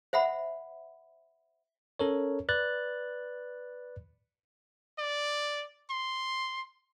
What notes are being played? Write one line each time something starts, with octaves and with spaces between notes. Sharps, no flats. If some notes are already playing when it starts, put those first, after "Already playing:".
C5 E5 F#5 B5
C#4 A4 A#4 C#5
B4 D5 F#6 A6
D5
C6